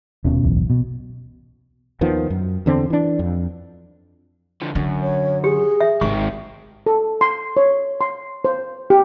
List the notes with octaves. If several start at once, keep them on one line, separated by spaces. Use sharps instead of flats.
D#1 B2 C#4
D1 B1 E2
B2
D#2 D#3 F3 B3
F#2
E2 D3 C4
E3 D4
F2
D3 F3
F#2 D3
C#5
G4 G#4
E5
G#1 D#3 C4 C#6
A4
C6
C#5
C6
C5
G4